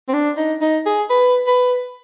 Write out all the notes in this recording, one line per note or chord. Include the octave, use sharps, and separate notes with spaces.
C4
D4
D#4
D#4
G#4
B4
B4